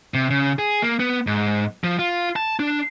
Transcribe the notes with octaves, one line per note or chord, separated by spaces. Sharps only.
C3
C#3
G#4
A#3
B3
G#2
F3
F4
A5
D4